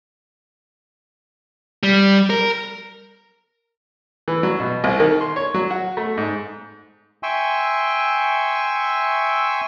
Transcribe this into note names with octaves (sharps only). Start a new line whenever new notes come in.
G3
A#4
E3
F#3
B2
C2
D#3
C6
C#5
F#3
F#4
A3
G#2
E5 G5 G#5 C6 C#6 E6